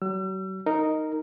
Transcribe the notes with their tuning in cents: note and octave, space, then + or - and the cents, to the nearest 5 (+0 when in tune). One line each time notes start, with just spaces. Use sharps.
F#3 +40 E6 +40
D#4 +0 A#4 -15